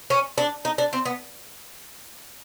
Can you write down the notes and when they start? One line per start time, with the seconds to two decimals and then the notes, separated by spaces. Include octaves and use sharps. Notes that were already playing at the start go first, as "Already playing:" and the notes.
0.10 C#4
0.38 D4
0.65 D#4
0.78 D4
0.93 C4
1.05 B3